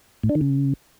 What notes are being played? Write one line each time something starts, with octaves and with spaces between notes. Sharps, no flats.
A2
D4
D#3
C#3